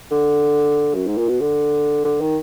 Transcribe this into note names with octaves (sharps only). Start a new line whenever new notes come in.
D3
F#2
G#2
A#2
B2
D3
D3
D#3